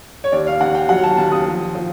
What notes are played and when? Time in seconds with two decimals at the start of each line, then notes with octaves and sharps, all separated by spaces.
0.24 C#5
0.32 D#2 D5
0.47 F5
0.61 D#2 F#5
0.75 G5
0.89 F#3 F#5
1.04 A5
1.17 D#2 A5
1.32 D#6
1.46 F3
1.75 F3